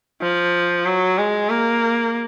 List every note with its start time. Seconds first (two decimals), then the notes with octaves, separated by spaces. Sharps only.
0.21 F3
0.86 F#3
1.18 G#3
1.50 A#3